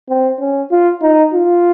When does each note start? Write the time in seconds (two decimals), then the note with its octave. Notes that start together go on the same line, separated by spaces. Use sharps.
0.09 C4
0.40 C#4
0.71 F4
1.02 D#4
1.33 F4